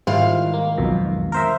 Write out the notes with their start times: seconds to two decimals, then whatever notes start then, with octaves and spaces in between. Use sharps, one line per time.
0.07 G#2 D#3 G3 E4 F4 F5
0.54 A#3
0.78 B1 F2 B2
1.32 A#4 C5 E5